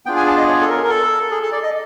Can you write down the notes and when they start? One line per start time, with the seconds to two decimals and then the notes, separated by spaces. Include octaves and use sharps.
0.06 B3 D4 F4 G#4 G5
0.17 G#5
0.27 A5
0.37 D#5
0.48 C#5
0.61 A4
0.69 A#4
0.84 A#4
0.90 A4
1.31 G#4
1.43 A4
1.52 D5
1.63 D#5